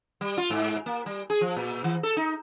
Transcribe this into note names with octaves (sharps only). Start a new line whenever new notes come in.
G3
F4
G#2
A#3
G3
G#4
F3
A#2
E3
A4
D#4